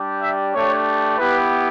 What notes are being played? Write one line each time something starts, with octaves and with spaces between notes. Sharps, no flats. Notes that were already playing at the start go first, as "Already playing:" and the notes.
Already playing: G3 D4 G4
E5
A3 D4 G4 C#5
B3 E4 G4 B4